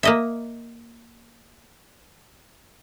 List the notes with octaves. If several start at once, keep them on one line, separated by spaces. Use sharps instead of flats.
A#3 D#5 E5